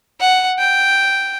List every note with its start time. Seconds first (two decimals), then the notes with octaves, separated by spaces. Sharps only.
0.20 F#5
0.59 G5